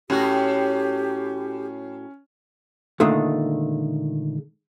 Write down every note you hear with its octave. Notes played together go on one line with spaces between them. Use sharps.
A2 C#4 F#4 G4
A#2 D3 D#3 G#3 A3